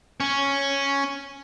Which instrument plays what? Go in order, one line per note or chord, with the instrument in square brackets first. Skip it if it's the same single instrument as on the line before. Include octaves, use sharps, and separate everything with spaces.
[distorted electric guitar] C#4